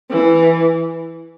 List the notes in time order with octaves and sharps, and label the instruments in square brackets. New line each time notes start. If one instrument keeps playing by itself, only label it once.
[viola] E3